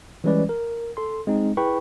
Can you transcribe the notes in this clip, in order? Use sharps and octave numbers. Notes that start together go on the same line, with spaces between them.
E3 G3 G#3 C#4 B4 D5
A#4
A4 C6
G#3 C4 D#4
E4 G#4 B4 G5 B5 C#6